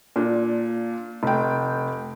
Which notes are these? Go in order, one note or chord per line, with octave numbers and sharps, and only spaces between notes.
A#2 D4
F1 G5